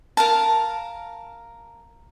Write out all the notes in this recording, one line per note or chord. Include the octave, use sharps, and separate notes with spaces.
A#4 F5 A5